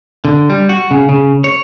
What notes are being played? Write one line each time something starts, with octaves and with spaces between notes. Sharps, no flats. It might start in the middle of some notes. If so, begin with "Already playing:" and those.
D3
G3
F#4
C#3
C#3
C#5